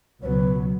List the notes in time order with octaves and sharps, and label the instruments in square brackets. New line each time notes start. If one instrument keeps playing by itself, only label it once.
[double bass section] C#2 B2 F#3 B3 [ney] B4 C#5